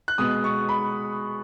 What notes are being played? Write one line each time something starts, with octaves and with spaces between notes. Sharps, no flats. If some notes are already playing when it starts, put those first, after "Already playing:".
F#6
B2 G#3 B3 D#6
C#6
B5